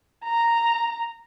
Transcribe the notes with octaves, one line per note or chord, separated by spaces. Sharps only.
A#5